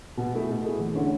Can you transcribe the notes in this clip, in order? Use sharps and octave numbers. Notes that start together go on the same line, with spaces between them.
B2
A3 E4 G#4
B2
A3 E4 G#4
E2
D3 A3 C#4